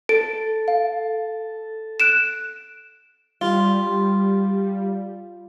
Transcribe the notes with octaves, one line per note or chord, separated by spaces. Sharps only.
A4 D7
F5
F#6 D7 E7
G3 F4